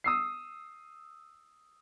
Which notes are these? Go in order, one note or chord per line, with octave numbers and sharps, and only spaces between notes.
D#6 E6 C7